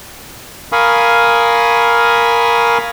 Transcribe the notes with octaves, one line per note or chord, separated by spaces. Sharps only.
A#4 F5 G#5 B5 C#6 D#6